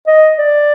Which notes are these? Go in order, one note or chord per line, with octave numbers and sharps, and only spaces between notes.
D#5
D5